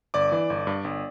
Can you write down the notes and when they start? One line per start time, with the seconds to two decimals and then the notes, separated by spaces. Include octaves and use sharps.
0.14 G1 D5 D6
0.32 E3
0.50 G1
0.67 G2
0.84 G1